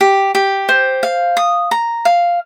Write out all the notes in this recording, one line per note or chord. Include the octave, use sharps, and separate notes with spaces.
G4
G4
C5
F5
D#6
A#5
F5